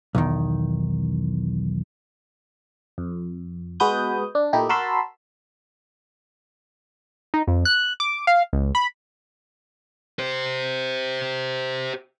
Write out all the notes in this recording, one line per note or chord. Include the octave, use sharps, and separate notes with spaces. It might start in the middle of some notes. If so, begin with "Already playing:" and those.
B1 E2 D#3
F2
G#3 B3 F#4 B4 D#6 G6
D4
A#2 A3 D#4 E4 G4
F#4 A#4 A5 B5 C6 E6
D#4
F2
F#6
D6
F5
C#2
B5
G4 C5